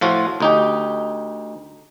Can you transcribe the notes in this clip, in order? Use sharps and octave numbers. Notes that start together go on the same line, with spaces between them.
A2 F3 F4 F#4
D2 D#4 G4